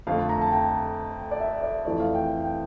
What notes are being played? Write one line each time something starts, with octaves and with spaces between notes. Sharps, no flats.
F2 D3 A3 F5
A#5
A5
G5
D5
E5
D5
F2 E3 A3 D5
F5
G5
G5